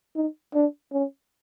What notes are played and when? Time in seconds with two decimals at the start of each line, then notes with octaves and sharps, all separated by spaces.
0.16 D#4
0.54 D4
0.93 C#4